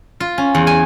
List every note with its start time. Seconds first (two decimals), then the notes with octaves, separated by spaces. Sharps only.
0.20 F4
0.38 C#4
0.55 E2
0.67 G#5